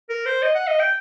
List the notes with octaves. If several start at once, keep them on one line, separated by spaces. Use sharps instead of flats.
A#4
C5
D#5
F#5
D#5
G5